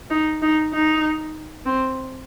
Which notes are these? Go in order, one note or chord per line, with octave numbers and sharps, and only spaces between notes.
D#4
D#4
D#4
C4